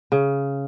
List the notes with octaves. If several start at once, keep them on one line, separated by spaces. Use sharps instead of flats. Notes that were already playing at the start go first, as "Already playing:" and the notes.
C#3